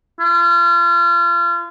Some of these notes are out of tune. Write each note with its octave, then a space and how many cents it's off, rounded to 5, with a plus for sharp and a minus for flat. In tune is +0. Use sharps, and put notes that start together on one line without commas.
F4 -35